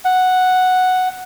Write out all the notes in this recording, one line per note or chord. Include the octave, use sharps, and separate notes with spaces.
F#5